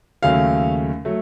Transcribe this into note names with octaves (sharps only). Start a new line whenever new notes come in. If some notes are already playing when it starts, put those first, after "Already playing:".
D#2 C#3 F#3 A3 F5
F#3 A3